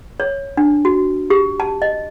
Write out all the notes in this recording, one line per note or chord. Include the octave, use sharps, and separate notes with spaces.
C#5
D4
F#4
G4
A5
D#5